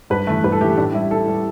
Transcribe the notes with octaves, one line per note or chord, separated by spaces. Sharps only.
G2 B4
E3 A3
G2 B4
A4
E3 A3 G4
A2 D4
G3 E4
A2 A4
G3